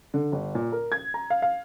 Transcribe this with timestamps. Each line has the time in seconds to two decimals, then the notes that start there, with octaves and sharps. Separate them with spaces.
0.14 D3
0.32 G1
0.55 A#2
0.72 A#4
0.92 G#6
1.14 A#5
1.30 F5
1.42 F5